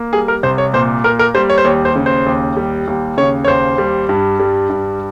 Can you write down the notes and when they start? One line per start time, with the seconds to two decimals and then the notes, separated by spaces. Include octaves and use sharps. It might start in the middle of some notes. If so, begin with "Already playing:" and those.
Already playing: A#3
0.13 G3 G#4
0.28 A#4
0.43 C2 C5
0.58 C#5
0.74 A#2 C5
1.04 A#3 A#4
1.19 A#4
1.35 G3 C5
1.50 C#5
1.58 C5
1.65 D#2 C#5
1.85 C5
1.96 C#3
2.06 C5
2.26 D#2
2.57 G3
2.87 D#2
3.17 C#3 C#5
3.45 C#5
3.48 D#2 C5
3.78 G3
4.09 G2
4.40 G3
4.70 G2